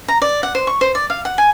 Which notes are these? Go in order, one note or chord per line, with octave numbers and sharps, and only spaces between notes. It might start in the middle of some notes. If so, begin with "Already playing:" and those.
A#5
D5
F#5
C5
C#6
C5
D5
F5
F#5
G#5